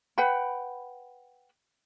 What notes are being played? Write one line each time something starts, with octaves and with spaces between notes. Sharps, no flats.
B4 F#5 G5 B5